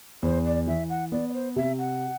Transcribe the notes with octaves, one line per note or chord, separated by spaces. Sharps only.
E2 C5
D5
E3 E5
F#5
B3 D5
D5
C5
C3 E5
F#5